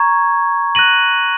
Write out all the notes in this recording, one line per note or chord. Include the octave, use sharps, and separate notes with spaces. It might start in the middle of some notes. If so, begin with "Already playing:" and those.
Already playing: A#5 C#6 G#6
F#6 A#6 D#7 F#7